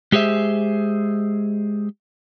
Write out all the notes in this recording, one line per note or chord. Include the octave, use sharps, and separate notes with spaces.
G#3 G4 G#4 C5 E5